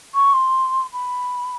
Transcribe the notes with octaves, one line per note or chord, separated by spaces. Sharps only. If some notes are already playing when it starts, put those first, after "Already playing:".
C#6
C6
B5